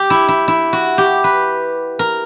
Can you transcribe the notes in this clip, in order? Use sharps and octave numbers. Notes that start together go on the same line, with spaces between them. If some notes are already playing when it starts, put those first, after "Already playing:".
Already playing: G4
E4
E4
E4
F#4
G4
B4
A#4